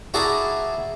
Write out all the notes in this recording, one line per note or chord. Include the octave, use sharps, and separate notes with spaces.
E4 F#4 G#4 D5 A5 A#5